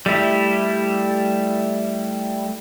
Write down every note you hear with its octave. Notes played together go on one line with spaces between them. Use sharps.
G3 A3 E4